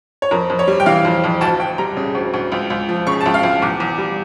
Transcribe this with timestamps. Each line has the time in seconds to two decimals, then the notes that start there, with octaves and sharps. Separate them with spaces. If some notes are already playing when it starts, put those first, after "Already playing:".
0.22 C#5
0.31 F2 A#4
0.50 F2
0.59 C#5
0.68 G3
0.80 G5
0.86 E3 F5
1.05 F2
1.24 F2
1.41 D2 A5
1.60 D2 G5
1.78 G3 A#5
1.97 C#3
2.15 D2
2.34 D2
2.52 C#2
2.70 C#2
2.89 F3
3.07 C#3 C#6
3.21 A5
3.26 C#2
3.34 F5
3.43 C#2
3.62 E2 D6
3.80 E2
3.98 G3